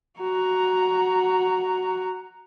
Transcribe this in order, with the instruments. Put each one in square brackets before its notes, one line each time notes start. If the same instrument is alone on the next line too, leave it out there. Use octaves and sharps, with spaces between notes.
[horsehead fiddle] F#4 A#5